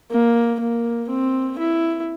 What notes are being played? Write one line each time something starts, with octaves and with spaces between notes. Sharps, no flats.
A#3
A#3
C4
E4